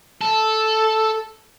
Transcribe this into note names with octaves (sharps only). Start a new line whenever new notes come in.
A4